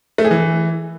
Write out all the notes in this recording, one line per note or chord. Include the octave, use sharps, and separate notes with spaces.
A3
G#4
E3